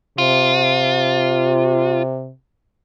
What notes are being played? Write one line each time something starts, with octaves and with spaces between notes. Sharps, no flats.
C3 F4